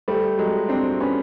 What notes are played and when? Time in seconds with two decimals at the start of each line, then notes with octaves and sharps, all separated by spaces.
0.08 G3 A3
0.38 F#3 G#3
0.69 C4 D4
1.00 B3 C#4